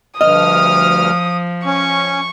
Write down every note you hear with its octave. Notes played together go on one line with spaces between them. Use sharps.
D2 G2 F3 D#5 D#6 F6
C#4 C#6